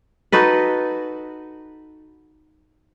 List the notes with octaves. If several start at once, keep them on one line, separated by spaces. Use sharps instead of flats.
D#4 F#4 A4 B4